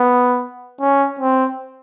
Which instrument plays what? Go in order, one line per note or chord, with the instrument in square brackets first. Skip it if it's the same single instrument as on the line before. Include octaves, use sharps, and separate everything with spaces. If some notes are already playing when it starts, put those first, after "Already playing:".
Already playing: [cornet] B3
C#4
C4